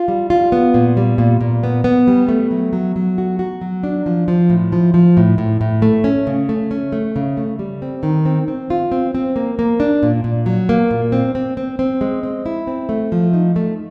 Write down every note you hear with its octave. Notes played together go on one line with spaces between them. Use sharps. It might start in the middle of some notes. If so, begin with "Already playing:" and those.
Already playing: F4
G3
F4
B3
A#2
G3
A#2
A#2
B3
B3
G3
A3
F#3
F#3
F#3
F#4
F#4
F#3
D4
F3
F3
A2
F3
F3
A2
A2
A2
A3
C#4
C#3
A3
C#4
A3
C#3
A3
G3
C4
D#3
C4
C4
F4
C4
C4
A#3
A#3
D4
A#2
A#2
F#3
A#3
A#2
C4
C4
C4
C4
G#3
C4
E4
C4
A3
F3
D#4
A3